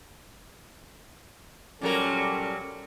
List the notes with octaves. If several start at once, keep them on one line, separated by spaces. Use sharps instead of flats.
A#2 F#3 G3 C#4 A4 A#4